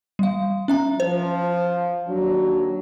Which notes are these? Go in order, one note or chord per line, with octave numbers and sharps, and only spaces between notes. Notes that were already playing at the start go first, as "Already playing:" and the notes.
G3 F5
C#4 E5 A#5
F3 C5
D#2 F#3 D4